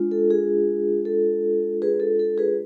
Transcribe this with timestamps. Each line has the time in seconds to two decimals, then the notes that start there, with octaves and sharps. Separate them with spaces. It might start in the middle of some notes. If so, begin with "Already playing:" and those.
Already playing: G#3 D4 F4
0.11 A4
0.31 G#4
1.06 A4
1.82 G#4 B4
2.00 A4
2.19 A4
2.38 G#4 B4